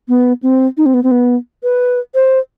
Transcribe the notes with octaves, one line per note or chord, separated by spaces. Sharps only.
B3
C4
D#4
C4
B3
C4
B3
B4
C5